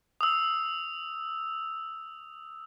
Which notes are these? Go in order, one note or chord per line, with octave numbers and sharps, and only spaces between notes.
D#6 E6